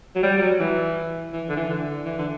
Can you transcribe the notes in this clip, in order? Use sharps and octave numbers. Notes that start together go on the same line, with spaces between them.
F#3
G3
G3
F#3
E3
E3
D3
E3
D3
E3
D3